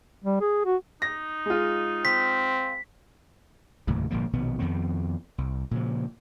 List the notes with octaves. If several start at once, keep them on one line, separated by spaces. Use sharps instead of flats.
G3
G#4
F#4
D#4 A#6
G#3 F4
C4 B6
F1 D#2 A2 C#3
G1 A#2 F3 A#3
A#1 B2 D#3 B3
F2 D#3 B3 C4
C2
A#2 C#3 F3